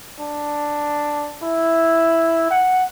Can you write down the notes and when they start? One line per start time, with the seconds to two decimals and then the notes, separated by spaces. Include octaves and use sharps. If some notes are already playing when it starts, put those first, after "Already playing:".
0.19 D4
1.43 E4
2.51 F#5